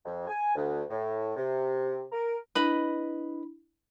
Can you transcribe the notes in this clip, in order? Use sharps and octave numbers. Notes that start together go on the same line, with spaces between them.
F2
G#5
D2
A2
C3
A#4
D4 E4 B4 D#5 B5